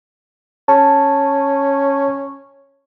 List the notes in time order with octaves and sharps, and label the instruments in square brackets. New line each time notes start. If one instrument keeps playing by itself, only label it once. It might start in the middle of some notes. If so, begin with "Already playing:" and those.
[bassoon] C#4 [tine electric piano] A5